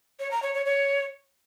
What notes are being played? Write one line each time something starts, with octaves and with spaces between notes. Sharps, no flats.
C#5
A#5
C#5
C#5
C#5